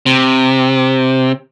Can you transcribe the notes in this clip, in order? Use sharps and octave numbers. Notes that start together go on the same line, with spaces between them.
C3